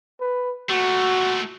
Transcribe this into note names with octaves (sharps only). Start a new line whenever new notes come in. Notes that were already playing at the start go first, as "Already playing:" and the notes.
B4
A#2 A3 F#4